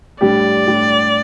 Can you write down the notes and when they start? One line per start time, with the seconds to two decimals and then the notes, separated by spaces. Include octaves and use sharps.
0.21 A2 G3 D4 G4 D5
0.67 A2 G3 D4 G4